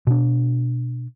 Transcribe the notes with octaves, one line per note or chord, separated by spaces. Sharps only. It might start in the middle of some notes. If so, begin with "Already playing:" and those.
B2 D4